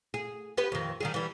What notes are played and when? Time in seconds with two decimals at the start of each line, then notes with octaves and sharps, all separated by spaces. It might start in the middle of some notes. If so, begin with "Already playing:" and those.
0.14 G#4
0.57 B3 G4 B4
0.72 F2 D#3
1.00 D#3 G3 G#4
1.14 E3 G3